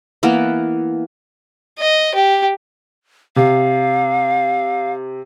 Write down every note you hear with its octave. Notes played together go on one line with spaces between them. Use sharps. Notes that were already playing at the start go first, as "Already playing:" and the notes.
E3 A#3 B3 A#4
D#5
G4
C3 F5